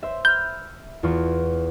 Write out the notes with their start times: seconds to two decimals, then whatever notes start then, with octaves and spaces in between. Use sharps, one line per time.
0.03 C5 E5
0.25 B5 E6 F6 G6
1.03 E2 F4 C#6